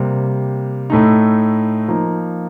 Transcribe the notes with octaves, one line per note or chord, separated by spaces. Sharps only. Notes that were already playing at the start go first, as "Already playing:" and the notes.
Already playing: C3 G3 A#3
A2 A3 D#4
F3 A#3 D#4